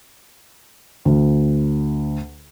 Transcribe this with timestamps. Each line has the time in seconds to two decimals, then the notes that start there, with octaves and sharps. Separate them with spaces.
1.05 D2